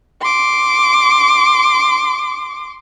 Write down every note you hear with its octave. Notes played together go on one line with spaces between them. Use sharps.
C6 D6